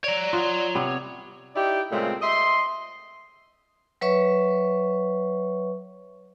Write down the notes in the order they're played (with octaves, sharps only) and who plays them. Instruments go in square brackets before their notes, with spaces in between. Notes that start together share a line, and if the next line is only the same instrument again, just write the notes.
[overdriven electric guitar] C#5 A#5 [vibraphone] D5
[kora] F4 D#5 F#5
C3 B3
[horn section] D#4 E4 G4 D5 G5
A#2 C#3 G#3 A3 C4
D#5 E5 C6
[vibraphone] F#3 B4 C#5 E5 C#6